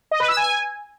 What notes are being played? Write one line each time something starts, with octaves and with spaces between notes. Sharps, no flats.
D#5
B4
E6
G#5